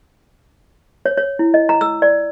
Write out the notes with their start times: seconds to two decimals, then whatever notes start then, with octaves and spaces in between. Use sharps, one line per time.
1.06 C#5
1.17 C#5
1.39 E4
1.54 D#5
1.69 A#5
1.81 E6
2.02 D5